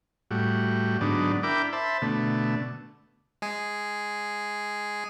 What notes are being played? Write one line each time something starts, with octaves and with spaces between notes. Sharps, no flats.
A2 G3 F#4
G#2 D3 F#3 B3 D4 D#4
D4 E4 A#4 G5 B5 D6
C5 E5 A5 B5
B2 D3 A3
G#3 G#4